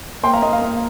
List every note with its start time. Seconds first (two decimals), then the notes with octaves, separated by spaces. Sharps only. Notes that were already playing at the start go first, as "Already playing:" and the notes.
0.23 A#3 G5 C6
0.33 F5 A#5
0.42 A#3 D#5
0.53 F5
0.62 A#3